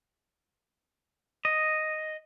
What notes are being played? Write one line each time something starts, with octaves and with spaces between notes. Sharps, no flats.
D#5